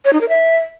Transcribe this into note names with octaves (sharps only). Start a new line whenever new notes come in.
C#5
D#4
A#4
E5